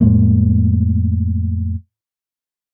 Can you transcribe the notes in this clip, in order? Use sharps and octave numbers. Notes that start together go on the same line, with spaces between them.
F2 A2 G#3 A#3